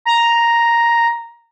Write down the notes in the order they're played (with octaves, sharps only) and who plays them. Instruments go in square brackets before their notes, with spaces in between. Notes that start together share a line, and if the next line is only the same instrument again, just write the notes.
[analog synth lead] A#5